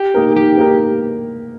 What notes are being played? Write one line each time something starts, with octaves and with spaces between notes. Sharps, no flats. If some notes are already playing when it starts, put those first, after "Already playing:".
Already playing: G4
A#3 D#4 A#4
D#3 G4
A#3 D#4 A#4